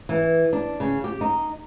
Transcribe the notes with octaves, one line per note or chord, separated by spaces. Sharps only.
E3
D4
C#3
G4
D#4